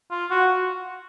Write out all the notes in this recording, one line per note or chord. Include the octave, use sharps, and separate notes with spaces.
F4
F#4